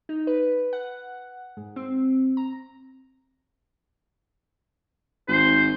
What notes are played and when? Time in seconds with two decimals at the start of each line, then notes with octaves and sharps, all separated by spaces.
0.09 D#4
0.27 B4
0.73 F#5
1.57 G#2
1.76 C4
2.37 A#5
5.28 G#1 C5